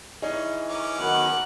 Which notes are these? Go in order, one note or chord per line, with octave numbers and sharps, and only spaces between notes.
E3 C#4 D#4 G#4 C#5
C#4 A#4 D6
D#3 F#3 B3 F#5 F#6